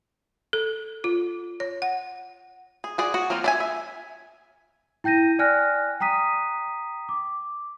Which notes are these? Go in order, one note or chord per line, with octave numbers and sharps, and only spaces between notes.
A4
F4
C#5
F#5
G#4
F#4 G#4 D5
F#4
F3 A#3 C4 F4
D4 E5 G#5
E5
E4 G5 G6 A#6 D#7
D5 G5 G#5 F6 F#6 A#6
G5 A#5 D#6 B6 D#7
D6